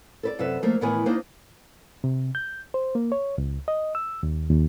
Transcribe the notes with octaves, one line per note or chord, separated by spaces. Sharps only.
A4 B4 D5
F#2 C3 B4 E5
F3 A3 A#3
A2 D#3 E3 B3 A#4 G#5
A#3 D4 D#4 C5
C3
G6
C5
A#3
C#5
C#2
D#5
E6
D#2
D#2